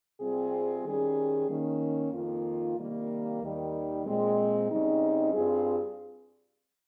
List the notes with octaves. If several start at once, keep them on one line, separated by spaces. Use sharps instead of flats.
C3 G3 C4 F4 G#4
D#3 G3 C#4 G#4
D#3 A#3 C#4
F2 D#3 A#3 F4
C3 D#3 G3 A#3
D#2 D#3 G3
A#2 G#3 C4
C#3 G3 C4 D#4
G2 G3 C4 F4 G#4